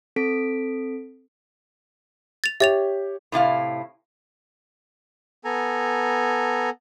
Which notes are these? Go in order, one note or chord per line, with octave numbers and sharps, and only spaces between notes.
C4 A4 B6 D7
A6 F7
G4 C#5 E5 A6 F7
A2 C3 E4 F5
B3 A4 G#5 A#5